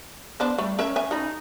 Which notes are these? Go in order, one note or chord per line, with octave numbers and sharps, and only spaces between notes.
B3 D4 C5
G3 A3
C#4 A#4 C#5 E5
E5 G#5
D#4 A4 B5